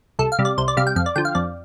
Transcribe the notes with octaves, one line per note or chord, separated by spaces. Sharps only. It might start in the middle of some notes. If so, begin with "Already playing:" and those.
C2 A4
F5
C3 G3
D5
C2 C5
D5
C3 G3 F5
G5
F2 F5
D5
D3 F3 G5
F5
F2 D5